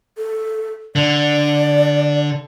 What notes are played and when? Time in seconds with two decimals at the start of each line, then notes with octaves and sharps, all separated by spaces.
0.18 A4
0.96 D3 D5